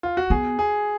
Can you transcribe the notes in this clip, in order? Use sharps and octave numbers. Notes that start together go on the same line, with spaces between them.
F4
F#4
B3 G#4
G#4